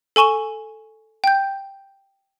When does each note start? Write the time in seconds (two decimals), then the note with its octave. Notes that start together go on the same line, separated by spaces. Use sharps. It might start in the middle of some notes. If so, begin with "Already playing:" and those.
0.16 A4 G#5 C#6 E7 G7
1.24 G5 G6